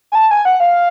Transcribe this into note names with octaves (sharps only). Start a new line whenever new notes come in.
G#5
A5
G#5
F#5
F5